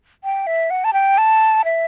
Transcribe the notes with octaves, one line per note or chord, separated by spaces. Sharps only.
G5
E5
F#5
A5
G5
A5
E5